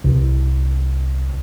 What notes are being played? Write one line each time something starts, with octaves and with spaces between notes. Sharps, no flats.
C2